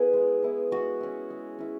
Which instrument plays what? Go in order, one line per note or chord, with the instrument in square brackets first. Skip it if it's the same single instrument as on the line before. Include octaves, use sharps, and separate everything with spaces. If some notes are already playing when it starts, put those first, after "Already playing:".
Already playing: [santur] B3 E4 G#4
G#3
B3 E4
G#3 F#4
C#4 E4
G#3
C#4 E4